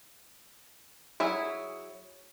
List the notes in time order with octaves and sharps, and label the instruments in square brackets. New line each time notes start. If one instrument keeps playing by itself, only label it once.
[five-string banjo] F#3 E4 G#4 B5